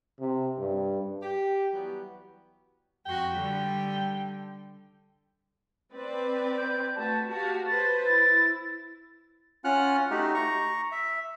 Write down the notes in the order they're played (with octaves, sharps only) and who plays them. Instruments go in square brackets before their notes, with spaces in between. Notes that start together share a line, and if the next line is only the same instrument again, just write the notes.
[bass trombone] C3
G2
[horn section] G4
E3 F#3 G3 B3
[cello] F2 F#4 [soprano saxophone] G5
[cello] D3 G3
[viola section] C4 B4 D5
[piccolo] G6
[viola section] A3 F#4 B4 [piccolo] A5
[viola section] F#4 G4 F5 [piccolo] A5
[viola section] B4 C5 [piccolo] A6
[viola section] E4 [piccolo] A6
[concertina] C#4 F4 F#5 F6 F#6
A3 D#4 F#4 G4
A#5 C#6
E5